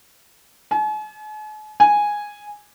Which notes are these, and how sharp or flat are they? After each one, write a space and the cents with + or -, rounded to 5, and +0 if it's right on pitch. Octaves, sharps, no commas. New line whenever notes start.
G#5 +45
G#5 -5